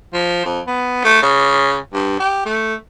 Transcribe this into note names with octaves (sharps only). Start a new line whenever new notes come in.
F3
F2
B3
A3
C#3
G2
G4
A3